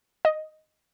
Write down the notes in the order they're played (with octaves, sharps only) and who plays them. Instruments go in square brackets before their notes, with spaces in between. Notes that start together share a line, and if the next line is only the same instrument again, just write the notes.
[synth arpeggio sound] D#5